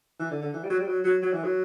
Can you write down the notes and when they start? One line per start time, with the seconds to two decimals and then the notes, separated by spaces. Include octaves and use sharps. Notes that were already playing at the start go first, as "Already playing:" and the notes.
0.20 E3
0.31 D3
0.42 D3
0.54 E3
0.64 G3
0.70 F#3
0.79 G3
0.88 F#3
1.05 F#3
1.22 F#3
1.33 E3
1.44 F#3